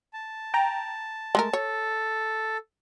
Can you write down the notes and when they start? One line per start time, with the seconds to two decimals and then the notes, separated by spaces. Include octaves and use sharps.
0.13 A5
0.54 G5 A#5
1.35 G#3 A3 A#4
1.53 A4 C#5